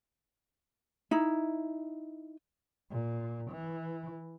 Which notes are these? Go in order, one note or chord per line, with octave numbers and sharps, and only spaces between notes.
D#4 E4
A#2
E3